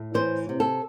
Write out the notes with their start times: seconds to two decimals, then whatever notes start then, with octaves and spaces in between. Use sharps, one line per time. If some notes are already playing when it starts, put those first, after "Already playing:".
Already playing: A2
0.14 E3 C5
0.49 C3
0.60 A4